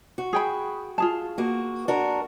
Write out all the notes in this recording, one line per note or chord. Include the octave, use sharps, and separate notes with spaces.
F#4
G#4 G5 B5
F4 G#4 A5
A#3 F#4
D4 F#4 A#4